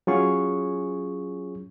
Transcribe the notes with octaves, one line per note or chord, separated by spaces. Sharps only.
F#3 C#4 F4 G#4 C#6